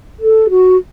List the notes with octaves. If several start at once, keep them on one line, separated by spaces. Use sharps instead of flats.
A4
F#4